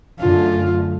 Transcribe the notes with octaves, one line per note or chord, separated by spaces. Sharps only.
F#2 D3 A3 F4